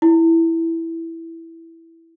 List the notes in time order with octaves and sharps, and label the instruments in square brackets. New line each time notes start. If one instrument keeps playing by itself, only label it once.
[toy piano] E4